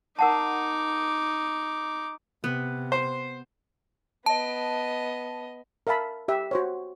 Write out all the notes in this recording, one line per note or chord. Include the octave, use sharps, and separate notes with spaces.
D#4 A#4 F#5 A5 D6
C3 B3
C5
B3 D#5 A5
A#4 E5 F5 A5 B5
G4 E5
F#4 C5 C#5